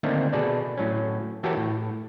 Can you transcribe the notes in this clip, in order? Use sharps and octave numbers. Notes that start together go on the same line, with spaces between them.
D3 D#3 A3 A#3 C4 D#4
B2 G#4 A4 B4 D5
A2 F#3 C#4
E3 F#4 G4 A4 A#4 C#5
A2